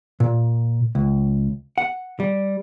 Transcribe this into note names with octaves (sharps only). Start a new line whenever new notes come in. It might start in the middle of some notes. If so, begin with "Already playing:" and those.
A#2
C#2
F#5
G3